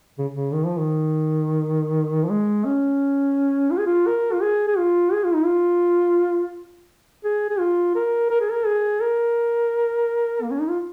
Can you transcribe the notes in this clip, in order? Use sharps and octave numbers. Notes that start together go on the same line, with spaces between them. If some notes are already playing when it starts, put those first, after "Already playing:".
C#3
C#3
D#3
F3
D#3
F3
G#3
C#4
F4
G#4
F4
A#4
F4
G#4
G#4
F4
G#4
F4
D#4
F4
G#4
G#4
F4
A#4
A#4
G#4
A#4
G#4
A#4
A#3
C#4
D#4
F4